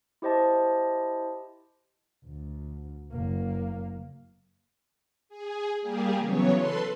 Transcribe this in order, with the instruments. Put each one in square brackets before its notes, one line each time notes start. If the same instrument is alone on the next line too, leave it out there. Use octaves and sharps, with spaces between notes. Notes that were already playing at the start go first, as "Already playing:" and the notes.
[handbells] E4 G4 C5 D#5 A5
[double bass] D2
F#1 A#3
[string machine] G#4
G3 A#3 G4 G#4
C#3 E3 F#3 B3 C#5
A4 B4 C6